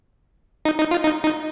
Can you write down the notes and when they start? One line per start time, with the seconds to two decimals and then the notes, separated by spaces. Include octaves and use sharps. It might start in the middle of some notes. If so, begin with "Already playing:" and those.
0.65 D#4
0.79 D#4
0.91 F4
1.04 D#4
1.24 D#4